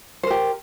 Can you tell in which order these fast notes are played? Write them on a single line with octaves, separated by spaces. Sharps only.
C5 A#4 G4